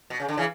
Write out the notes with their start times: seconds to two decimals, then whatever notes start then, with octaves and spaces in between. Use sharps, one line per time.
0.10 B2
0.20 C#3
0.28 D3
0.37 C#3 E3